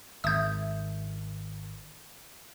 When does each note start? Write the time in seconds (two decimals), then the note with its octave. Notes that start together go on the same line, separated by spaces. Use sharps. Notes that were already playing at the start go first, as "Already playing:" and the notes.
0.24 G#1 E5 D#6 G6